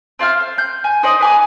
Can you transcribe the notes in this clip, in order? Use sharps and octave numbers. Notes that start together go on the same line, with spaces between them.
C4 F4 E5 F6
C5
G6
G#5
D#4 C5 D5 D#5
B4 G#5 D6